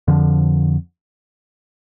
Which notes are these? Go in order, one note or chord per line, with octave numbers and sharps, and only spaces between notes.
F2 D3 F3